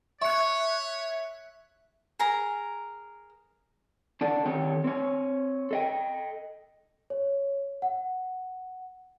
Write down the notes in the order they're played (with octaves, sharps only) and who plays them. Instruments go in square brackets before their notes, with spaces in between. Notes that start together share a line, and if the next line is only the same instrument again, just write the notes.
[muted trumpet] C#5 [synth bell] E5 F#6 [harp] C#6 C#7
[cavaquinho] G#4 A#4 A#5
[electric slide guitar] C#4 D4 A4 D5
D#3 C4 G4 A4 C#5
C4 C#5
A4 D#5 G5
[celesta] C#5
F#5